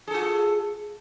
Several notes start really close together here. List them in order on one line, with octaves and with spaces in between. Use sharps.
G#4 A4 F4